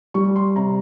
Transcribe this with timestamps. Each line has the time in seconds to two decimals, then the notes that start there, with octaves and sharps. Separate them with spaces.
0.14 G3 C#6
0.36 C6
0.56 C3 A#5